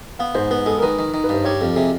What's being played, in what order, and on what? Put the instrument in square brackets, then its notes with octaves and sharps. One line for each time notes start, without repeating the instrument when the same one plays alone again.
[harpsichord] B3 [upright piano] F5
[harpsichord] G#2 [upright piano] C5
[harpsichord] B3 [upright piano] B4
[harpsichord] G#3 [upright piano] A4
[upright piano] A#4
[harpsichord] D#3 [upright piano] B4
[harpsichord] D#3
D#3
[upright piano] B4
[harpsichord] G2
[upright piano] C5
[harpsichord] G3 [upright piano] C#5
[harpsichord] F2 [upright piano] A4
[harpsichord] C3 [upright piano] G#4